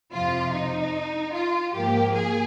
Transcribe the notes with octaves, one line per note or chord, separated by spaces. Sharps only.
F2 C3 F3 F4
D#4
F4
G#2 F3 A#3 G4
G#4